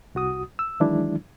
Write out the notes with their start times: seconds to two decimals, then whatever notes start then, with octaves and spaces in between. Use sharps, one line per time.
0.15 C2 F#4 D#6
0.59 E6
0.80 D#3 E3 F#3 G#3 D4 E4